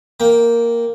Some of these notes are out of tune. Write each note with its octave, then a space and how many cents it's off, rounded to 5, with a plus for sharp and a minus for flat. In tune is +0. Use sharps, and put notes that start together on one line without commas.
A#3 +0 G5 +0